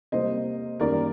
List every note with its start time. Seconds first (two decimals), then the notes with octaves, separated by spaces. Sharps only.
0.12 C3 G3 A#3 C5 D#5
0.80 F#2 D#3 G3 A#3 A#4 D5